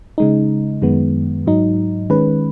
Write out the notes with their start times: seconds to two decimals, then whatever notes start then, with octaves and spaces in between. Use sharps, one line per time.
0.18 C#3 G#3 D#4
0.82 F#2 D#3 G#3 B3
1.46 G#2 F#3 D#4
2.10 D#3 G#3 C#4 B4